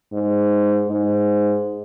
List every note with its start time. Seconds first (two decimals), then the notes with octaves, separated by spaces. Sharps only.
0.13 G#2
0.88 G#2